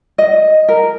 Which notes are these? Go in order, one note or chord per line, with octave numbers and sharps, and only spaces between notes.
D#5
A#4